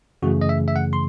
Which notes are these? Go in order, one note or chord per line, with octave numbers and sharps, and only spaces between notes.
F#2 C#3 E3 A3 F#4
D#5
E5
E5
F#5
C6